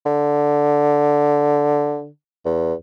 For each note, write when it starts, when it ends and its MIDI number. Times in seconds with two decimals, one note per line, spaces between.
0.06 2.08 50
2.45 2.74 40